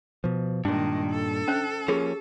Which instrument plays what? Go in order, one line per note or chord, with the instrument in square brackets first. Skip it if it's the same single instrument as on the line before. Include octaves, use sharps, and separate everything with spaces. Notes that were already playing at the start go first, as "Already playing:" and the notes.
[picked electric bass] B2 F3
[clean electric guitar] G2 A#2 [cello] D#3 G#3 [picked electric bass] D4
[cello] A4
[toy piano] C#4 C5 E5
[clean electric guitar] F3 A#3 C#4 [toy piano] G4 G#4